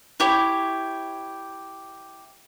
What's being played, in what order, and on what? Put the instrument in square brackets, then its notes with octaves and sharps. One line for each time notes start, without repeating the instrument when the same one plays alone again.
[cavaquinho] E4 G4 C#5